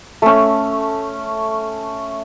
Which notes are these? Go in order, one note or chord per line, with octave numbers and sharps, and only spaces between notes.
A3 C#4